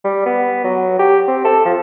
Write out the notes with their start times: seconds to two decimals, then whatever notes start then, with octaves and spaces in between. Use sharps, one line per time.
0.04 G3
0.26 B3
0.64 F#3
0.99 G4
1.27 C4
1.45 A4
1.65 F3